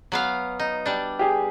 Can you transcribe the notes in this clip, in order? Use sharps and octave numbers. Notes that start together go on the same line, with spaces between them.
F#3 B3 F5
D#4
G3 D4
G4 G#4